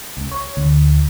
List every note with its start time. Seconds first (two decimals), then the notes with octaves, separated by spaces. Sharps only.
0.17 C#2
0.31 C#5
0.57 D2